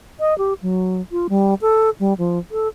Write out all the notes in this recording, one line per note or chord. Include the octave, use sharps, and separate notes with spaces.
D#5
G4
F#3
F4
G3
A4
G3
F3
A4